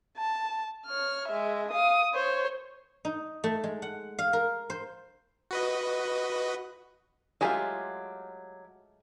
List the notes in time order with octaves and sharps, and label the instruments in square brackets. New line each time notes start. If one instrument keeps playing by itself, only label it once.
[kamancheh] A5
C#5 F6
G#3 E5
F5 D#6
C5 C#5
[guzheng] D#4
A3
G#3
F#5
F5
A#4
C5
[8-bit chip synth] F#4 B4 D#5
[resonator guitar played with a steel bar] F#3 G4 G#5 [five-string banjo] G#3 A3 F4